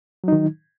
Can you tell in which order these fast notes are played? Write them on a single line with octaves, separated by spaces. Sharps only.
F#3 D#4 D#3